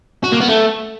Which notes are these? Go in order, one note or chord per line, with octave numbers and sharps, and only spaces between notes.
F#4
A#3
B3
A3